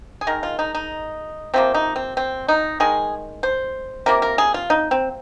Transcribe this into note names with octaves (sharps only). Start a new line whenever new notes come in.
G#4
D#3 G#3 A#4
F4
D#4
D#4
C3 F3 A#3 C4
D#4
C4
C4
D#4
D#3 G#3 G#4
C5
C3 F3 A#3 A#4
A#4
G#4
F4
D#4
C4